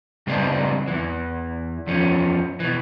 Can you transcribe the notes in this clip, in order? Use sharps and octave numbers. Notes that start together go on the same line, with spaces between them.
C#3 G3 G#3 B3 C4 D4
E2 E3
E2 F3 C#4
B2 E3